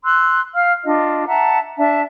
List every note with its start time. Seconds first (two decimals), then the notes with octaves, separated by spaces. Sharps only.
0.05 C6 E6 F#6
0.55 F5 F6
0.84 D4 F4 D#5
1.27 E5 F#5 A5 A#5
1.79 D4 E5 A5